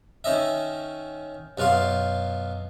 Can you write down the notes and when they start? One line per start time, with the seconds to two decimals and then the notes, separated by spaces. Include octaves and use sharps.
0.24 D#3 C#4 D#5 E5
1.58 F#2 B2 F4 F5 C6